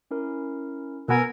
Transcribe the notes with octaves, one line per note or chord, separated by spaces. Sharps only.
C#4 E4 A#4
B2 B3 A#4 G#5 E6 F#6